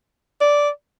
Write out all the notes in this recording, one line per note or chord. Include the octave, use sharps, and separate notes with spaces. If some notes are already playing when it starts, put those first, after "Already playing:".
D5